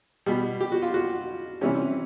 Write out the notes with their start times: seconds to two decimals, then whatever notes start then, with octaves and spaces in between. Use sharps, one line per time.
0.26 B2 G3
0.60 G4
0.72 F#4
0.82 F4
0.94 F#4
1.61 C3 E3 G3 C#4